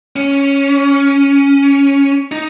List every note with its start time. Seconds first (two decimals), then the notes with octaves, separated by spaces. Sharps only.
0.16 C#4
2.32 D#4